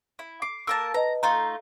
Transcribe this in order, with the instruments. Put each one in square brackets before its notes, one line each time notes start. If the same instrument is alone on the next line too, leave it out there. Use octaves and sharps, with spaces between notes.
[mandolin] E4
[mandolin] D6 [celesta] C7
[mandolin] A#3 A#4 A5 [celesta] E6
[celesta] B4 D#5 [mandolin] A#5
[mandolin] A3 D#4 F4 [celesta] A#5